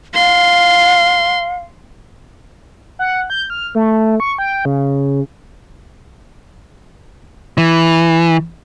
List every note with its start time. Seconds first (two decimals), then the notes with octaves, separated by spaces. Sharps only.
0.14 F5 C6
2.99 F#5
3.30 G6
3.50 F6
3.75 A3
4.20 C#6
4.38 G5
4.65 C#3
7.58 E3